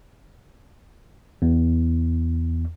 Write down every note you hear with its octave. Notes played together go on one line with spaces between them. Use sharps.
E2